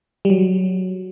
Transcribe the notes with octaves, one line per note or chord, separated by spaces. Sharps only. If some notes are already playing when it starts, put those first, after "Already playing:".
G3
F#3